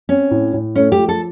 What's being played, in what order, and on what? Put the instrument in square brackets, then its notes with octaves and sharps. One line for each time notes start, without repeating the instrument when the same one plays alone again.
[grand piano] C4 [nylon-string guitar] C#4
[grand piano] A2
A2
[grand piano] A3 [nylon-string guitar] C#4
[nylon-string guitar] G4
[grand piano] F3
[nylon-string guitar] A4